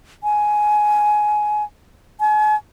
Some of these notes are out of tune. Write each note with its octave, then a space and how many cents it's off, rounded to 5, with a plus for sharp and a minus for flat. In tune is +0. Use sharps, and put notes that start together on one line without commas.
G#5 +15
G#5 +40